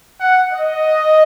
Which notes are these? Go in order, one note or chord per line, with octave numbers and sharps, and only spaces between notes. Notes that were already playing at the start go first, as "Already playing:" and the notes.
F#5
D#5